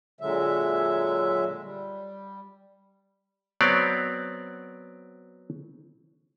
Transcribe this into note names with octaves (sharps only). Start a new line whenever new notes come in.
A#2 D3 F#3 G#3 E5
G3
F#3 B3 C4 C#5 D5